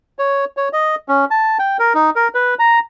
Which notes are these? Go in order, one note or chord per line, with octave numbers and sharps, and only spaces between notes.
C#5
C#5
D#5
C#4
A5
G5
A#4
D#4
A#4
B4
A#5